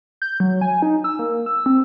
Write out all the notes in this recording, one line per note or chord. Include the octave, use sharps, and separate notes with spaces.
G6
F#3
G#5
D#4
E6
A#3
E6
C4